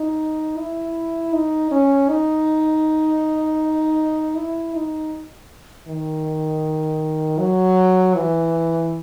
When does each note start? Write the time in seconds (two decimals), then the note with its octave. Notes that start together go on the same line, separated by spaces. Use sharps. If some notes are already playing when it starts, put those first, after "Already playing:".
Already playing: D#4
0.58 E4
1.33 D#4
1.71 C#4
2.09 D#4
4.36 E4
4.74 D#4
5.88 D#3
7.39 F#3
8.15 E3